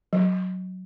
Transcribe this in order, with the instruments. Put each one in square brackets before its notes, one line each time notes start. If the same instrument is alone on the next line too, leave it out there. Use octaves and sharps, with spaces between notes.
[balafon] F#3